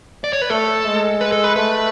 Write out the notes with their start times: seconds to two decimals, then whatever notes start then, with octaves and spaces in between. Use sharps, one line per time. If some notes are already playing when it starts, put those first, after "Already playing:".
0.24 D5
0.33 C#5
0.41 B4
0.50 A3 A4
0.85 G#3
1.21 B4
1.32 A4
1.44 B4
1.56 A3 B4